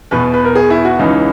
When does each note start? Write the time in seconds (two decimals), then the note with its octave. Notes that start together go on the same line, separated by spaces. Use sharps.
0.11 E2 B2 B4
0.34 B4
0.44 A#4
0.55 G#4
0.70 E4
0.85 F#4
0.99 C#2 C#3 E3 D#4